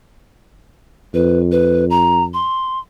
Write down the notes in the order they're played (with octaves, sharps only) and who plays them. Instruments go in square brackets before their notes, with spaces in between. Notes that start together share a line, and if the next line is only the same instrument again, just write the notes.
[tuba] F2 [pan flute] B4
[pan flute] B4
A#5
C6